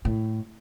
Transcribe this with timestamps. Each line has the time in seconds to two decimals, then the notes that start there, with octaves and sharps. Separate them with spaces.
0.05 A2